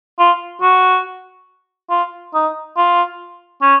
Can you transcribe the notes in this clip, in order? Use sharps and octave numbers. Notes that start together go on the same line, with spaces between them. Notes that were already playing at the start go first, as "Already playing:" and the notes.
F4
F#4
F4
D#4
F4
C#4